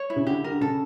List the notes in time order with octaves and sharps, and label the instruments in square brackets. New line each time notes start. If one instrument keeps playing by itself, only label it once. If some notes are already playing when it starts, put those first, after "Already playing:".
Already playing: [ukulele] C#5
E4
[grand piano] C#3
[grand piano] D3 [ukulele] G4
[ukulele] A#4
[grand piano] D3
[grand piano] C#3 [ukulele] A4